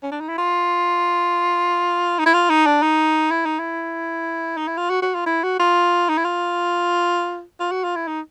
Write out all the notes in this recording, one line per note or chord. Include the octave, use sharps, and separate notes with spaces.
C#4
D4
D#4
E4
F4
D#4
E4
F4
D#4
D4
D#4
E4
D#4
E4
D#4
E4
F4
F#4
F#4
F4
E4
F#4
F4
D#4
E4
F4
F4
F#4
F4
E4
D#4